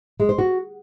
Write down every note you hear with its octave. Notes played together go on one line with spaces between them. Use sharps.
G#3
C5
F#4